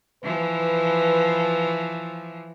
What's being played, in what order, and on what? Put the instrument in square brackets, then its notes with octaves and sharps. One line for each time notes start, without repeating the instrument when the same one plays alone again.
[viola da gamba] E3 F3 [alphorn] B4